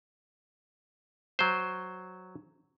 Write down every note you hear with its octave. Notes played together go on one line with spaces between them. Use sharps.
F#3 C5